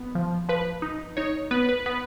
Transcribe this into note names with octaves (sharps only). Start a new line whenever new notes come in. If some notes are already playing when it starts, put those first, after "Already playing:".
Already playing: B3
F3
F3 B4
D#4
D#4 C#5
B3 B4
B4
B3 B4